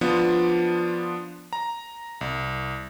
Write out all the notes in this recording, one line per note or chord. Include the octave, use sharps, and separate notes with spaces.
F3 B3 D4 F4
A#5
C2